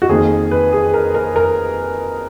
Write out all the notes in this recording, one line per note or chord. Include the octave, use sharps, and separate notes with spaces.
F#4
F2 D#3 A#3 G#4
B4
G#4
A#4
A#4
A#4